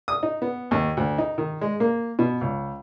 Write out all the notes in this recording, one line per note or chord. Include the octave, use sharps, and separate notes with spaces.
D#6
D#4
B3
D#2
D2
D#4
D#3
G#3
A#3
B2
C#2